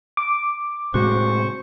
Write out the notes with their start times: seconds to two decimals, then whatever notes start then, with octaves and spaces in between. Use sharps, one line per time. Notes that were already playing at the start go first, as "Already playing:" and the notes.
0.17 D6
0.94 A2 C3 G#3 F#4 C5 C#6